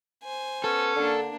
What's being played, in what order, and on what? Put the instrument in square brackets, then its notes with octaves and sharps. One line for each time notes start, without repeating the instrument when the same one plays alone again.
[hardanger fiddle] C5 G#5
[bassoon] B3 [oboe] C#4 [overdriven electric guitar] A4
[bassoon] D3 [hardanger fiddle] A#3 D4